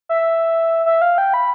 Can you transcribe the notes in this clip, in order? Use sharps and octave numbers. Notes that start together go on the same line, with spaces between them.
E5
E5
F5
G5
B5